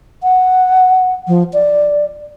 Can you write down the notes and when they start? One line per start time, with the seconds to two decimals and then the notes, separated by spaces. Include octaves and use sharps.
0.23 F#5
1.28 F3
1.53 D5